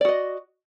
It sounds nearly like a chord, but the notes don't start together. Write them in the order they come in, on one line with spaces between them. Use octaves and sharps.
D5 F#4 D#5